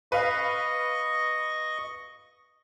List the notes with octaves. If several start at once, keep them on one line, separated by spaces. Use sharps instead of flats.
B4 D#5 F5 C#6